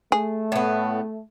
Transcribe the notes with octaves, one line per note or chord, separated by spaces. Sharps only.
A3 G#4
A2 B3